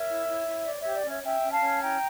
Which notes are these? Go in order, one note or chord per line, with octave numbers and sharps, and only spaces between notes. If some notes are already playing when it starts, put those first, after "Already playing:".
Already playing: A#4 C#5 E5
E4
E4
E4
C#5 D5
G4 C#5 E5
D5
C#4 C#5 E5
C#4 E5 G5
C#4
F5 A5
C#4
E4 G5 A#5